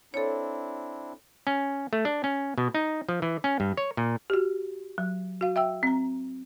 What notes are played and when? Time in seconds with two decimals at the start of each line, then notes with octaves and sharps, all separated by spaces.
0.14 C4 D4 E4 A4 C#5
1.47 C#4
1.93 A3
2.05 D4
2.24 C#4
2.58 B2
2.75 D#4
3.09 F3
3.22 E3
3.44 C#4
3.60 G2
3.77 C#5
3.97 A#2
4.30 F#4 G4
4.98 F#3
5.41 F#4 F5
5.56 E5 G5 E6
5.83 C4 A#5